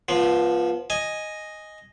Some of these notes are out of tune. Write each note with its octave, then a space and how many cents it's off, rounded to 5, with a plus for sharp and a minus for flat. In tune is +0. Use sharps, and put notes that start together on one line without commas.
F3 +0 B3 -30
D#5 +0 G#5 +0